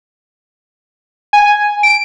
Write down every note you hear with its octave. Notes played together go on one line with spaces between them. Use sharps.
G#5
D7